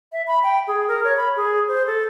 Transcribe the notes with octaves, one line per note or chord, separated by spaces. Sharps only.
E5
B5
G5
G#4
A#4
C#5
B5
G#4
C5
A4